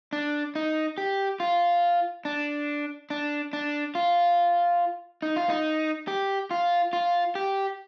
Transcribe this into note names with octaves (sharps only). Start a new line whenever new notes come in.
D4
D#4
G4
F4
D4
D4
D4
F4
D#4
F4
D#4
G4
F4
F4
G4